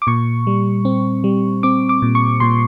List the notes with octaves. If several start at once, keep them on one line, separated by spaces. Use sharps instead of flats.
D6
A#2 C#6
G3
C4
G3
C4 D6
D6
A#2
C#6
A#2 C6